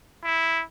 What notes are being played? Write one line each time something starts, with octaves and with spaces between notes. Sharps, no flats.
E4